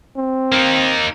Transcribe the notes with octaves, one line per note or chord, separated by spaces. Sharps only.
C4
A#3 D#4